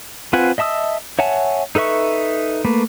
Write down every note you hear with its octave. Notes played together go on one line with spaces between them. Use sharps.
C4 F4 B4 F#5 G#5
D#5 E5 A5 D#6 E6
C#5 E5 F#5 G#5 A5
D#4 A4 B4 E5 C#6
A3 A#3 B4